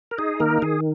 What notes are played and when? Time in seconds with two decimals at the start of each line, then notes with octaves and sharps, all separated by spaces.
0.11 A#4
0.18 D#4 G#4
0.40 D#3 A#3 A#4
0.62 D#3 G#4